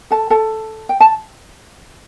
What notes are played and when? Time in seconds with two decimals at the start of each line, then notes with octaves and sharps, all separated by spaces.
0.11 A4 A5
0.30 A4 A5
0.89 G5
1.01 A5